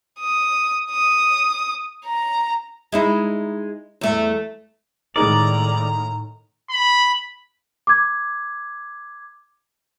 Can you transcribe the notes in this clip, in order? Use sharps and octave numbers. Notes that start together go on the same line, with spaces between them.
D#6
D#6
A#5
G#3 D#4 E4
E2 A3
A2 D#3 G#3 D#4 A#4 D5 A#5
B5
D6 G#6